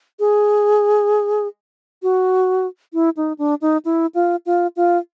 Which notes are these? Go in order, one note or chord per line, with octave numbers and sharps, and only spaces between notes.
G#4
F#4
E4
D#4
D4
D#4
E4
F4
F4
F4